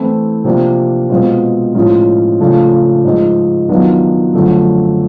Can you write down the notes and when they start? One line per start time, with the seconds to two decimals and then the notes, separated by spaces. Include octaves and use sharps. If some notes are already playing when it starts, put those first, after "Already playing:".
Already playing: E3 A3 C4 E4
0.44 C3 F3 A#3 D4
1.09 B2 G#3 C4 F4
1.74 A2 F3 G#3 C#4 F4
2.40 C#3 F3 A3 D4 F4
3.04 G#2 F3 G#3
3.69 D#3 F#3 B3 D4 F4
4.33 F#2 D3 F3 A3